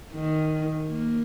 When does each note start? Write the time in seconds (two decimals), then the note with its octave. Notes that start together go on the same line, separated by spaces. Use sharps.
0.13 D#3
0.88 A#3